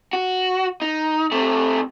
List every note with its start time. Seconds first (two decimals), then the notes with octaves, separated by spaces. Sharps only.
0.13 F#4
0.82 D#4
1.32 C3 A3